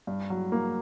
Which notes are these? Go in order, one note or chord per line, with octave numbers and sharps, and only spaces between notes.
G2
F#3
A#3